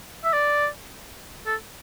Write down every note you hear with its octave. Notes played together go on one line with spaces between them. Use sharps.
E5
D5
A4